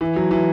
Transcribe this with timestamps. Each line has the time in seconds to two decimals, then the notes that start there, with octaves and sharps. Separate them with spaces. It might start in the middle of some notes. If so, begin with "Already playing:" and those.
0.01 E3
0.16 F#3
0.31 E3